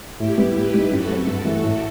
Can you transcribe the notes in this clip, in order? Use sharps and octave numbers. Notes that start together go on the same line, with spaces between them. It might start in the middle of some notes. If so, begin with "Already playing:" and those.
A2 E4 G4
G3 B3
A2 G4 B4
G3 D#4
F#2 F#4 A4
F#3 C4
G2 F#4 A4
E3 A3
A2